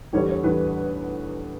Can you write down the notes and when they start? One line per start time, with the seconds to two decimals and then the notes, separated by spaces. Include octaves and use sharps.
0.13 E2 D3 G3 C#5
0.28 C#5
0.44 E2 D3 G3 B4